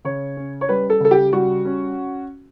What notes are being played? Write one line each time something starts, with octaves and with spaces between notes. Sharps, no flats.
C#3 C#5
C#4
C#5
G3 B4
A4
C#3 A4
G4
G3 F#4
C#4